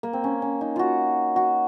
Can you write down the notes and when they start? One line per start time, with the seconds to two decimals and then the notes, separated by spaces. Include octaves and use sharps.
0.03 A#3
0.13 C4
0.24 C#4
0.42 C#4
0.61 D#4
0.76 F4 F#4
1.36 F#4